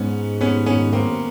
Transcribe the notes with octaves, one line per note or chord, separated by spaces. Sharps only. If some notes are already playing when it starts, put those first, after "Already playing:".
Already playing: G#2 B3 C#4
B3 C#4
B3 C#4
A#3 C4